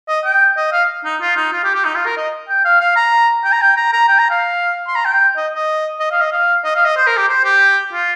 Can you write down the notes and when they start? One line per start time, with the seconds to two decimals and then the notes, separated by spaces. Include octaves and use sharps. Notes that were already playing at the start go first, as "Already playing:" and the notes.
0.08 D#5
0.25 G5
0.57 D#5
0.72 F5
1.04 D#4
1.21 F4
1.36 D#4
1.52 F4
1.64 G4
1.74 G4
1.85 D#4
1.95 F4
2.06 A#4
2.17 D#5
2.49 G5
2.64 F5
2.80 F5
2.96 A#5
3.44 G5
3.52 A#5
3.61 G5
3.76 A#5
3.93 A#5
4.08 G5
4.19 A#5
4.30 F5
4.87 C6
4.95 A#5
5.05 G5
5.36 D#5
5.53 D#5
5.99 D#5
6.11 F5
6.21 D#5
6.32 F5
6.64 D#5
6.75 F5
6.85 D#5
6.97 C5
7.07 A#4
7.17 G4
7.28 C5
7.44 G4
7.92 F4